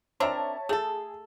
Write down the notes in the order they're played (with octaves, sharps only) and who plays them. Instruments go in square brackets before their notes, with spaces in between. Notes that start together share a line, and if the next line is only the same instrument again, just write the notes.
[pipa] C4 D4 A#4 [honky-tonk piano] C#5 E5 A5
[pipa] A3 A4 [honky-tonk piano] G#4